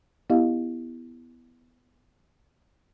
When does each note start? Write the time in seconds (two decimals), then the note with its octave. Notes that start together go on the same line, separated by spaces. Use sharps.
0.30 B3 E4 G4 D#5 F5